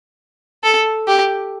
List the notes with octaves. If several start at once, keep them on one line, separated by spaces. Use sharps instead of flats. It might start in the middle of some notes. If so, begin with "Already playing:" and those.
A4
G4